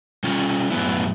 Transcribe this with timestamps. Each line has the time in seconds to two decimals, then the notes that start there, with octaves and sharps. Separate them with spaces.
0.24 G3 C#4 F4
0.71 F#2 A2 B3 E4